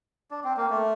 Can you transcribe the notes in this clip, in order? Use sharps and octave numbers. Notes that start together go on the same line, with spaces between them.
D4
C4
A#3
A3